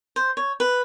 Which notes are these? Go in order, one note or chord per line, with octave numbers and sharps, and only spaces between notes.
C5
C#5
B4